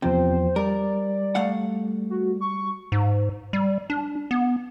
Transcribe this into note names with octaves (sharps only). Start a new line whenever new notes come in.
E2 C3 F3 C5 G5
G3 A#4 D5
A3 F5 F#5
F#4
C#6
G#2
G3
D4
B3